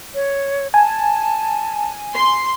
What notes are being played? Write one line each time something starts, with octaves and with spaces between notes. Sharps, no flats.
C#5
G#5 A5
C6